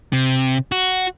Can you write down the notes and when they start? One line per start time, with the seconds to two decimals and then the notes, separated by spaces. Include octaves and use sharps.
0.13 C3
0.72 F#4